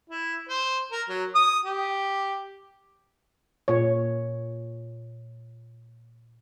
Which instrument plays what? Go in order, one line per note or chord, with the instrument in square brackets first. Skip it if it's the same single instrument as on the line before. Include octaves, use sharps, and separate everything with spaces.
[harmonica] E4
C5
A#4
F#3
D#6
G4
[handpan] A#2 C#5